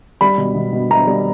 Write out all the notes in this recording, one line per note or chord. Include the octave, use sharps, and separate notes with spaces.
G3 B5
B2
B2
B2
B2 A#5
G3